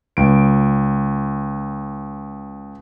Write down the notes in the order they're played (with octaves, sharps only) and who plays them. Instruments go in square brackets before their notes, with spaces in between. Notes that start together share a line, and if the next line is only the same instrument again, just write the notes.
[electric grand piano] C#2 D7